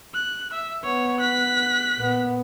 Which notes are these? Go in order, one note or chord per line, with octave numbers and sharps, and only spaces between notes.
F#6
E5
B3 C#5
F#6 B6
A#2 B3